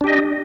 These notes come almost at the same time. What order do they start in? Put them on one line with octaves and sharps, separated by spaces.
D4 G4 D#5